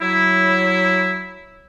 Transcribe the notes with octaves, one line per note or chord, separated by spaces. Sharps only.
F#3 E4